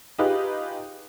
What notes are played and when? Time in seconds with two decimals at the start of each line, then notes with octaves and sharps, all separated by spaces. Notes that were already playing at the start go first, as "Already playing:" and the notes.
0.18 D#4 F4 G4 G#4 B4